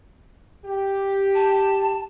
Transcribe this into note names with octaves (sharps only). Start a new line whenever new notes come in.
G4
A5